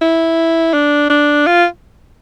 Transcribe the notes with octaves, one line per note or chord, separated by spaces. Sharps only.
E4
D4
D4
F4